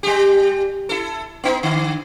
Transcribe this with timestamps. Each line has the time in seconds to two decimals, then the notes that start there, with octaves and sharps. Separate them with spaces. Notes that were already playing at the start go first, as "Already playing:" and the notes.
0.03 G3 G4
0.89 E4 A4
1.44 B3 D#4
1.63 D3